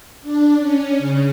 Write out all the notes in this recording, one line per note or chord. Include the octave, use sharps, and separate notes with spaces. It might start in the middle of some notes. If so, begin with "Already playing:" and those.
D4
C#4
C#3